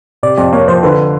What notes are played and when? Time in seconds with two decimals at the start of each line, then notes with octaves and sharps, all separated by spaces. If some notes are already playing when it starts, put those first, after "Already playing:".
0.23 C3 D5
0.38 F2 D5
0.53 A#3 C#5
0.68 F3 C5
0.83 D3 B4